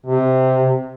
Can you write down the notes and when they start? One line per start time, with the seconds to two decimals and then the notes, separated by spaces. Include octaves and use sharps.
0.06 C3